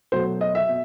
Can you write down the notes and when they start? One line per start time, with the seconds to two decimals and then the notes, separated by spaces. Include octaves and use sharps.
0.12 B2 F#3 A3 C5
0.41 D#5
0.55 E5
0.69 B2